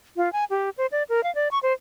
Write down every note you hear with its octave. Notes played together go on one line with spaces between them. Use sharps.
F4
G#5
G4
C5
D5
A#4
F5
D5
C#6
C5